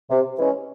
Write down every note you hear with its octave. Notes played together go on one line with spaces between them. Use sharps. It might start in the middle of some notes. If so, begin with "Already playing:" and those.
C3
E3 G#3 C#4